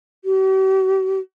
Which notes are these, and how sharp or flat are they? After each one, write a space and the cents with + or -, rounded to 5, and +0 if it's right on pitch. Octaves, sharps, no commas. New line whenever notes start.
G4 -45